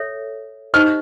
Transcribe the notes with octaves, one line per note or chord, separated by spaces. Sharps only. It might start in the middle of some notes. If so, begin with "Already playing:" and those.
Already playing: A4 C#5 E5
D#4 G4 C5 D#5 F6